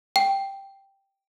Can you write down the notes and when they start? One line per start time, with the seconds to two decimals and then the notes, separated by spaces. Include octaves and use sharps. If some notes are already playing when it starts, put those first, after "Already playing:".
0.16 G5